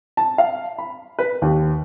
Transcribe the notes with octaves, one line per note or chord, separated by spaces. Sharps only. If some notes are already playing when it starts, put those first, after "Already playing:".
A5
F5
B5
B4
D#2